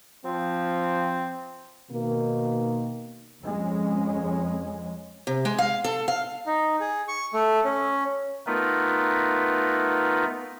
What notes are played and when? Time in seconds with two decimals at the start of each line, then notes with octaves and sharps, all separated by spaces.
0.25 F3 C4
1.91 B2 D#3 A#3
3.42 F2 G#3 C#4
5.27 C3
5.45 G#3
5.59 F5
5.84 A4
6.08 F5
6.46 D#4
6.80 G#4
7.08 C#6
7.34 A3
7.64 C#4
8.47 A3 B3 D#4 F4 A#4 B4